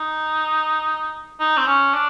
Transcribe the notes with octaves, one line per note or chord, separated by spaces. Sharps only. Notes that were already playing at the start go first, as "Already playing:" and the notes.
Already playing: D#4
D#4
C4
C#4
D4